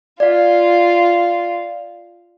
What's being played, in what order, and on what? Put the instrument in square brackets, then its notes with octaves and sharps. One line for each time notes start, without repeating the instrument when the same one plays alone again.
[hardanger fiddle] F4 [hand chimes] D5 F5